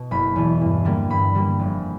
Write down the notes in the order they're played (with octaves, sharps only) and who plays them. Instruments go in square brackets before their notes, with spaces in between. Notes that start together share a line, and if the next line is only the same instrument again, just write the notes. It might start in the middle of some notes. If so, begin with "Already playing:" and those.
Already playing: [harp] B2
F#1 B5
E2 B2
G2
D3 G3 A#3
G2 B5
D3 G3 A#3
F1